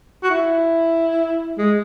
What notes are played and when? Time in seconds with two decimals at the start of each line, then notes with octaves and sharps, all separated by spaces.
0.23 F#4
0.30 E4
1.58 G#3